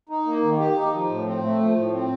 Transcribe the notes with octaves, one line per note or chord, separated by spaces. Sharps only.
D#4
A#3
D#3
G4
D#4
F3
A2
C4
A3
F3
A2
C4